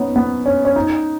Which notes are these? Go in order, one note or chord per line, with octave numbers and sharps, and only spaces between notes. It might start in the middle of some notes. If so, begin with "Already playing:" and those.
Already playing: B3 C#4 D#4
B3
C#4
C#4
D#4